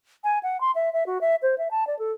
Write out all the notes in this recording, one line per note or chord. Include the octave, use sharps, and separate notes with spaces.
G#5
F#5
C6
E5
E5
F#4
E5
C5
E5
A5
D5
A4